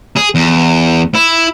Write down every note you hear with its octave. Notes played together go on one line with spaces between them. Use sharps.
G#4
E2
E4